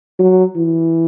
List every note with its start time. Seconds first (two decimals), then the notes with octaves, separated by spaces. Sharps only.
0.19 F#3
0.56 E3